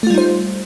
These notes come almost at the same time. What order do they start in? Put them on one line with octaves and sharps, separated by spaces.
A3 F4 G3 D#4 C5